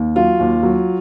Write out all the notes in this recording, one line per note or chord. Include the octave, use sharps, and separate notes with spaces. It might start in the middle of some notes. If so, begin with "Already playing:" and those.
Already playing: D#2
F#3 F4
D#2
F#3